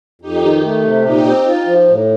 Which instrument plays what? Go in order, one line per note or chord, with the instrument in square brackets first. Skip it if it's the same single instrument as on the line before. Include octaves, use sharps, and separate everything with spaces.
[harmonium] F2 [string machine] D#4 G4
[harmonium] D#3
A3
C3
[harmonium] A#2 [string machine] D#4 G4
[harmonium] C4
F4
F3
A2